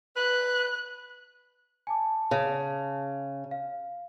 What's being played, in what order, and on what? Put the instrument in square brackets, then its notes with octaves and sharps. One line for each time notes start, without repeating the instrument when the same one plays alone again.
[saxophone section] B4 [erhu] F#6
[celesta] G#5 A5 D6
[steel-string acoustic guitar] C#3
[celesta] F5